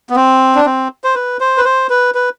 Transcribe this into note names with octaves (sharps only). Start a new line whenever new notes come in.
B3
C4
D4
C4
C5
B4
C5
B4
C5
B4
B4